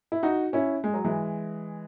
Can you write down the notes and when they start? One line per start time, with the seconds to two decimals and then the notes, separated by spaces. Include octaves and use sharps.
0.12 E4
0.23 D#4 F#4
0.53 C#4 E4
0.84 G#3
0.94 F#3
1.04 E3 G#3